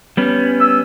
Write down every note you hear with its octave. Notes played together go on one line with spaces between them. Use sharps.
G3 B3 C#4
E6